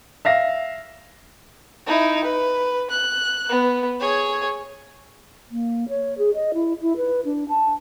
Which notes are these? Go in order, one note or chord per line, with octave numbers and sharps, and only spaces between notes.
E5 F5 A#6
D#4 E4
B4
F#6
B3
G#4 C#5
A#3
C#5
G#4
D#5
E4
E4
B4
D4
A5